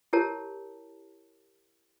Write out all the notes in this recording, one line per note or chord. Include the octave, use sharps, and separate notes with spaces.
E4 G4 A#4 C#5 A5